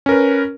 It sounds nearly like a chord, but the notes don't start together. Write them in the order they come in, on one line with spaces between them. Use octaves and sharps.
C#4 A#4 B4